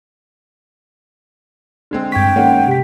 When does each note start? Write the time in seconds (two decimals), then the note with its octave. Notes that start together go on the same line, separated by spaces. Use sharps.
1.91 D3 G#3 C4
2.12 G2 G5 C#6 G#6 B6
2.36 D#3 G#3 A#3 C#4 F#5
2.67 C3 G4 B6